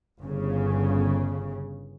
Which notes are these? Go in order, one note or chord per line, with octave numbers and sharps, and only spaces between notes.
G1 C#3